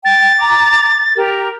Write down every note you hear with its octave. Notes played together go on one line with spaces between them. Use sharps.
G5 A6
A#5 D6
G4 A#4